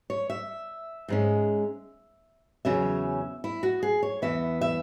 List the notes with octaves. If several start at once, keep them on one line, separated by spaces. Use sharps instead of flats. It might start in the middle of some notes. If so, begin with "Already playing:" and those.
C#5
E5
G#2 G#3 C#4
E2 C#3 F#3 C#4 E5
E4
F#4
G#4
C#5
E2 E3 B3 E5
E5